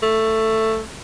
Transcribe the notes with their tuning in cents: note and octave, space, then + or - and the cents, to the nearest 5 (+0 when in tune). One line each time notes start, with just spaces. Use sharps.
A3 +10